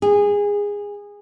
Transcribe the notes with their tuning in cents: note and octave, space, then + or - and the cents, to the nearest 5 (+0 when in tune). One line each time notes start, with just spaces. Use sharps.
G#4 -20